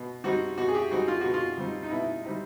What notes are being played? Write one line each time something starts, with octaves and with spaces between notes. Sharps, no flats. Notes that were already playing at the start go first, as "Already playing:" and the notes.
Already playing: B2
G3 C4 D#4 F#4
B2 F#4
G#4
G4
G3 C4 D#4 F#4
F4
B2 F#4
F4
G3 C4 D#4
D#4
B2 E4
G3 C4 D#4